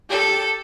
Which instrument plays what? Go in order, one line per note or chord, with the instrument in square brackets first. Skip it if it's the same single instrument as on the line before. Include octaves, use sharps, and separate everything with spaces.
[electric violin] G4 [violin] A4